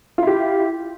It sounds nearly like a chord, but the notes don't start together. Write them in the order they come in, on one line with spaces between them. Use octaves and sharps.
F4 E4 G4